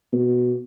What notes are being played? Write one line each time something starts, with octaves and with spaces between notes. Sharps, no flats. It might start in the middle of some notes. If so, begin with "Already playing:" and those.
B2